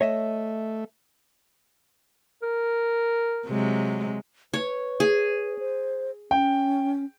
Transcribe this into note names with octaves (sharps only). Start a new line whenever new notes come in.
A3 C#5 D#5 E5
A#4
C3 F#3 G#3
B4 C#5
G#4
C5
C#4 G5